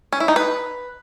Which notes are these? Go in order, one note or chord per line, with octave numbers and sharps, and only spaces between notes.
C#4
E4
D#4
B4